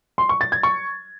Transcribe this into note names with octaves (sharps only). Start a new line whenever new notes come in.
C6
C#6
A6
G#6
C#6